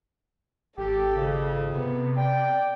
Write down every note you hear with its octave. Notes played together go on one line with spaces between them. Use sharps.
G#1 G4 A4
F2 C#3
C3 B3
D5 G5